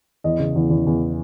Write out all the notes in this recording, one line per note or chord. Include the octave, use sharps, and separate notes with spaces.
E2 D#5
C#3
E2
E2
E2